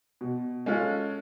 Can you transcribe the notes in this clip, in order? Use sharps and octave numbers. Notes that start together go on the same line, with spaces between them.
B2
G#3 C#4 F4 A4